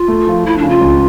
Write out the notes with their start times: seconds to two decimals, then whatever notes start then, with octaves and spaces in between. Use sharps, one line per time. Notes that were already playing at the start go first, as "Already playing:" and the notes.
Already playing: F4
0.08 A3
0.27 F3
0.45 F3 E4
0.58 D4
0.63 C#3
0.69 F4
0.81 C#2